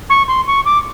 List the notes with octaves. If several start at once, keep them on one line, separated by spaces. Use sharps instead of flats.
C#6
C6
C#6
D6